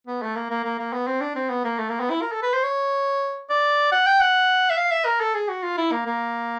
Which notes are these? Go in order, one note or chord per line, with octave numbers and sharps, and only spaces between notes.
B3
A3
A#3
A#3
A#3
A#3
B3
C4
D4
C4
B3
A#3
A3
A#3
B3
E4
A#4
A4
B4
C5
C#5
D5
F#5
G5
F#5
E5
F5
E5
A#4
A4
G#4
F#4
F4
E4
A#3
A#3